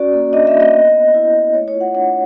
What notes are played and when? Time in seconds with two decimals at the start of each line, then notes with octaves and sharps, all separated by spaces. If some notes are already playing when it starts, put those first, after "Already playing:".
Already playing: C#4 F#4 D5
0.13 A#3
0.33 D4 D#5
0.47 E5
0.53 A#3
0.60 D#5
0.73 B3
0.93 B3
1.14 E4 D#5
1.34 E4
1.54 A3 C#5
1.68 C#5
1.74 F4
1.81 F#5
1.95 D4 F#5